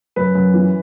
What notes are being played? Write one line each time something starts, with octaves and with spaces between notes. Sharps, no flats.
F#2 B4
F#2
E3